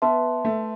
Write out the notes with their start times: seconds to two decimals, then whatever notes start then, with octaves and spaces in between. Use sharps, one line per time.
0.02 B3 B4 E5 A5 C6
0.45 A3